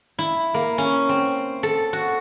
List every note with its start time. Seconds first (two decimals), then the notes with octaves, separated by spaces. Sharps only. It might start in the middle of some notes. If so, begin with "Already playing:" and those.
0.19 E4
0.54 A#3
0.78 C#4
1.09 C4
1.63 A4
1.93 F#4